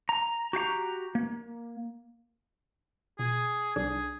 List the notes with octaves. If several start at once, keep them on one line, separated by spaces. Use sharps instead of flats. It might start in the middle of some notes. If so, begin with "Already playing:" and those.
A#5
F#4 G4 F5 A#5
A#3
B2 G#4
C2 D4 G#4